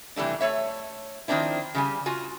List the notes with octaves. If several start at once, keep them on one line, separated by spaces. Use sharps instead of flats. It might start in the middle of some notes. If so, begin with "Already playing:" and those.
C3 E3 G3 A3 D4
A3 C#5 E5
D#3 F3 C4 D4 E4
C#3 G3 G#5
F4 F#4 G#5